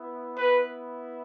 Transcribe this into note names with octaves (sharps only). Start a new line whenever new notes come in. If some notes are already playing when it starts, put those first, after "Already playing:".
Already playing: B3 E4
B3 E4 B4